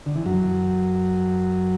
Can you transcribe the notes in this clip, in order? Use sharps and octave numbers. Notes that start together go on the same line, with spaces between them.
D3
E3
F#2 F#3